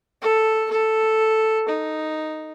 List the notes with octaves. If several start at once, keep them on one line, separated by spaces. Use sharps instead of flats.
A4
A4
D#4